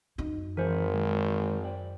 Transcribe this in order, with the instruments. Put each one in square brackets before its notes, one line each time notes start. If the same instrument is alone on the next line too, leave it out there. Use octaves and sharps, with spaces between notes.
[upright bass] F#2 D#4
[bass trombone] G#1 [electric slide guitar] E3 G#5 [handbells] A#4 C5
[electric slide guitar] D#3 F#3 G#3
D5 G5